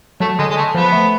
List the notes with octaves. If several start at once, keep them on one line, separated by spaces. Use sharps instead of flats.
F#3 A3
D3 G#3
G#3
A3
F3 B3
A3